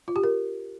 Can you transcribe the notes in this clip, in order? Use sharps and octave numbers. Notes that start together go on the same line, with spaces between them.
F4
G4
A#4